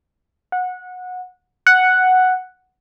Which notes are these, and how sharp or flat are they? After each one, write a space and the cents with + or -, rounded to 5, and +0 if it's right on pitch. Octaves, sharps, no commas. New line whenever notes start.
F#5 -20
F#5 +0